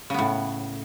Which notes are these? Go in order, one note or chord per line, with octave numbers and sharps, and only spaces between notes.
A2 C#3 B3